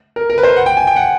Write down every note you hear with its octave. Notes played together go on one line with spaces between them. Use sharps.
A#4
A#4
B4
C5
F#5
G5
G#5
G5
F#5